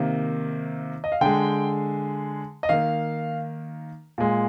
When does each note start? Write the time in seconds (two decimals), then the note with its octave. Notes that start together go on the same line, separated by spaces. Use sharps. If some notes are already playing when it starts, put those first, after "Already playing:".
Already playing: C3 D#3 A#3
1.04 D#5
1.12 F5
1.21 D3 G#3 G5
2.63 D#5
2.69 D#3 A#3 F5
4.18 A#2 G#3